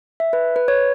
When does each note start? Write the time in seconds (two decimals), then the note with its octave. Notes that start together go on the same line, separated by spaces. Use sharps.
0.20 E5
0.33 B4
0.56 B4
0.68 C#5